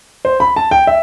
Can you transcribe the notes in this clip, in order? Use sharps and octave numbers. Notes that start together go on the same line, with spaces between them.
C5
B5
A5
G5
E5